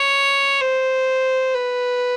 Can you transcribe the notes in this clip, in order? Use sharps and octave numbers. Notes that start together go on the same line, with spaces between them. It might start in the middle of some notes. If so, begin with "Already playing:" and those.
Already playing: C#5
C5
B4